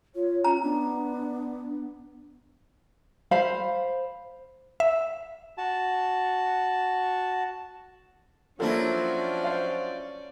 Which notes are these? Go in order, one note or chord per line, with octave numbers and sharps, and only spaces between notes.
F4 C#5
C#4 F4 A#5
B3 D4
C5 F5 B5
E5
F#4 A5
F3 F#3 A#3 C#4 D4 E4 A4 D5
C5 F5